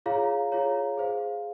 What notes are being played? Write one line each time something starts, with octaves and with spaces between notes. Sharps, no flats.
F4 G#4 C#5 F5 A#5
F4 G#4 C#5 F5 A#5
G#4 C5 F5